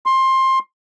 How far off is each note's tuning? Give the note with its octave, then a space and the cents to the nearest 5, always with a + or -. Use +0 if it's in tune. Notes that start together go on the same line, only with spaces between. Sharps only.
C6 +20